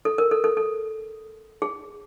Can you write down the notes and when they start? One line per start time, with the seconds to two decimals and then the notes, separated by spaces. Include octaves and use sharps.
0.05 A4
0.18 A#4
0.31 A4
0.44 A4
0.57 A4
1.62 G#4